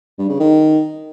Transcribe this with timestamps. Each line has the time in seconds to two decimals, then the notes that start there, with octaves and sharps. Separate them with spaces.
0.19 G2
0.29 C#3
0.40 D#3